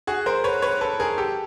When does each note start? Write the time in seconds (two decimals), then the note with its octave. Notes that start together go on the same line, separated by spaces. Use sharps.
0.07 F#4 G#4
0.26 A#4 C5
0.44 B4 C#5
0.62 B4 C#5
0.81 A4 B4
1.00 G#4 A#4
1.18 G4 A4